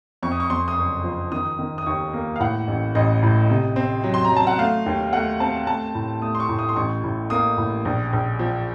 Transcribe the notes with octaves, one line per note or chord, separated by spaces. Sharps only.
F2 C#6
D#6
C#6
F2 C6
D#6
F#1 C#6
F3
D#3 D#6
D#3
D#6
D#2 C#6
A#3
F5
A2 F#5
A1
A1 D#5
A2
C3
C4
F#3
C6
A#5
F#3
A5
F#5
A3 F5
D#2
A3 F#5
C4 A5
A3 A5
A2
A3 D#6
C6
C#6
A2
D#6
C6
A1 C#6
A2
A#3 D#6
A2
A#1
A#1
F3